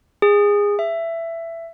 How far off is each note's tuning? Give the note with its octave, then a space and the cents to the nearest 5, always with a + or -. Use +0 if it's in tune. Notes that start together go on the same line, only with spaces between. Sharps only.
G#4 -20
E5 +15